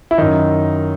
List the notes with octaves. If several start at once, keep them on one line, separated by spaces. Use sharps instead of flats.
E4
F#2 D#3 D#4